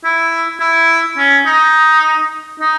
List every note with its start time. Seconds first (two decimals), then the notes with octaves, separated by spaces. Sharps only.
0.04 E4
0.60 E4
1.17 C#4
1.46 D#4
2.60 D#4